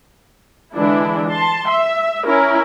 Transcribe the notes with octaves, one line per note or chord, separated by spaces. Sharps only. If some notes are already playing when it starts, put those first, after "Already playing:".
D3 E3 G#3 D4 E4
A5 C6
E5
C#4 E4 A#4